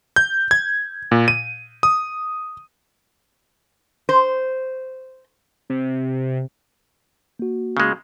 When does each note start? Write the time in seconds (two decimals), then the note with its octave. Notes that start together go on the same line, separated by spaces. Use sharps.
0.16 G6
0.51 G#6
1.12 A#2
1.28 D#7
1.83 D#6
4.09 C5
5.70 C3
7.39 A#3 F#4
7.77 C#3 G#3